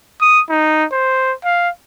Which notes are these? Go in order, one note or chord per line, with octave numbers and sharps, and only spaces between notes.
D#6
D#4
C5
F5